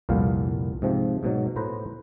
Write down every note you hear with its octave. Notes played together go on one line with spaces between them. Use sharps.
C2 F2 A#2 B3 F5
G#2 C3 F3
G#2 B2 F#3
A2 B4 C5 A#5